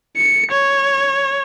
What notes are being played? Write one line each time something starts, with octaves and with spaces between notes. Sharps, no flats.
C#7
C#5